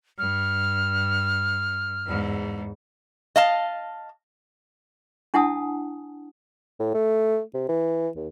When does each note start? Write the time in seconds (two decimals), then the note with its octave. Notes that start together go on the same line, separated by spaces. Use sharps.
0.18 G2 F6
2.06 E2 G#2
3.36 D#5 F5 A5
5.34 D4 E4 F#5 G#5 A5 D#6
6.80 A2
6.95 A3
7.54 C3
7.68 E3
8.16 D#2